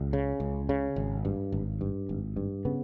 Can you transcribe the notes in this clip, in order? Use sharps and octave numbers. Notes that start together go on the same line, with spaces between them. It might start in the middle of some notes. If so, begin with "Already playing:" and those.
Already playing: C#2
C#3
C#2
C#3
G#1
G2
G#1
G2
G#1
G2
C#3 B3